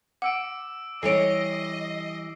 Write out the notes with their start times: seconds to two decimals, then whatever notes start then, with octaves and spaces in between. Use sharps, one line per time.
0.22 F#5 D6 E6 D7
1.03 E3 G3 A4 C#5 D#5 C7 D7